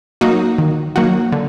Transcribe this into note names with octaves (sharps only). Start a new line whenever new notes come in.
F#3 A#3 D#4 F#4
D#3
F#3 A#3 D#4 F#4
D3